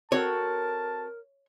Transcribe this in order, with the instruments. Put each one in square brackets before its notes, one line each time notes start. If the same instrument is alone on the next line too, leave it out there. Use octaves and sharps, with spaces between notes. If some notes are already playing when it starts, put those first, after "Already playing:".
[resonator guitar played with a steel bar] C4 F#4 A4 [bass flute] A#4 [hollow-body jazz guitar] C#5 [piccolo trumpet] A5